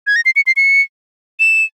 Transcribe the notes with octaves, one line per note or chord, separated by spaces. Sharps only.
G#6
A#6
C7
C#7
C7
C#7
E7